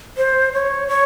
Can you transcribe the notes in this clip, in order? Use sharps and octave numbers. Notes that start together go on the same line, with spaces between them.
C5
C#5
C#5